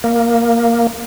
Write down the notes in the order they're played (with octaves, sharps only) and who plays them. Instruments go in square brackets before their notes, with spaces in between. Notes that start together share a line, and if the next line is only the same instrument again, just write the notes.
[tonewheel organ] A#3